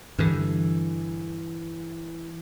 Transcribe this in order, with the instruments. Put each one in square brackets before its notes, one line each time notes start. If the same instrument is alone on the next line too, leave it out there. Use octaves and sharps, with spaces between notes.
[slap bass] G2 D3 [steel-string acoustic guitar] E3